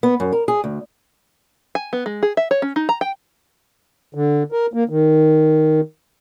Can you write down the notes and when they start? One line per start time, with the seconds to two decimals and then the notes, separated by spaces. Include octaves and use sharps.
0.03 B3
0.20 F#2
0.32 A#4
0.48 G#4
0.64 D2
1.75 G#5
1.93 B3
2.06 G#3
2.23 G#4
2.37 E5
2.51 C#5
2.62 C#4
2.76 D#4
2.89 A#5
3.01 G5
4.14 D3
4.52 A#4
4.74 A#3
4.89 D#3